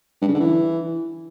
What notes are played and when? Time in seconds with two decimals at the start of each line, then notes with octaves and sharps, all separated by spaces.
0.22 G2
0.28 C#3
0.34 D3
0.40 E3